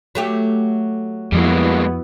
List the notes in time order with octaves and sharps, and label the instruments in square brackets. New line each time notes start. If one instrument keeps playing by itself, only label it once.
[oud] F#3 A3 G4
[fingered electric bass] F2 F3 [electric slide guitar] G3 G#3 A#3 [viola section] B3 E4 F#4